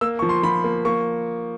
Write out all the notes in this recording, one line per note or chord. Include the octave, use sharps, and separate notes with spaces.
A#3 E6
F3 C#6
C6
F3 B5
A#3
A#3 C#6